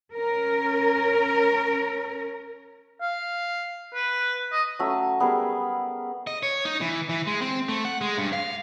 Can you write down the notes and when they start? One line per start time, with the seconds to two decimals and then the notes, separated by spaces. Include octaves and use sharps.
0.12 C#4 A#4
3.01 F5
3.94 B4
4.52 D#5
4.79 F#3 A3 C#4 E5
5.20 G3 B3 G#4 A#4
6.27 D#5
6.43 C#5
6.65 D#4
6.81 E3
7.09 E3
7.27 G#3
7.42 C4
7.69 A3
7.85 F#5
8.01 G#3
8.18 G2
8.33 F5